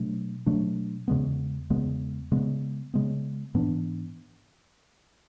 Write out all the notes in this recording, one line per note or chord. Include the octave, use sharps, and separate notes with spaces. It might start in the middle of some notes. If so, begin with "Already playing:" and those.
Already playing: B2 F#3 A3 D4
B2 F#3 A3 D4
E2 C#3 G#3 B3
E2 C#3 G#3 B3
C#3 G#3 B3
C#3 G#3 B3
G#2 E3 B3 D4